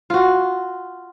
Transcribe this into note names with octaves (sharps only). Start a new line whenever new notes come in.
F4 F#4